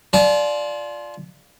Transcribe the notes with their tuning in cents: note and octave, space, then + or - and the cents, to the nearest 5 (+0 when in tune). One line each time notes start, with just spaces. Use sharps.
F4 +0 D5 +0 A5 -45